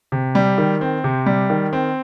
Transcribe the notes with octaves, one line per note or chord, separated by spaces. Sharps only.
C3
G3
D#3
C4
C3
G3
D#3
C4